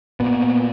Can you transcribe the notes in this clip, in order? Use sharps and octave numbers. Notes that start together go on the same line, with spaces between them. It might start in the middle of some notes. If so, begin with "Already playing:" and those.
A#2 B3